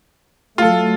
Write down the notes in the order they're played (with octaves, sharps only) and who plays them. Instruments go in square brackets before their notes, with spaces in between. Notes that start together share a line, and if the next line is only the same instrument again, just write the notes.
[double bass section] F#3 A3 [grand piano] F4 A4